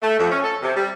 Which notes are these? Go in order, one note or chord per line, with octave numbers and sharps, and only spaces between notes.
A3
F2
C#4
A4
C3
G3